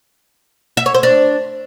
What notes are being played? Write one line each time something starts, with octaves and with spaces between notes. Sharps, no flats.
E5
C#5
C5
D4